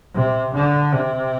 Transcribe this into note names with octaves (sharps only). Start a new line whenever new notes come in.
C3
D3
C3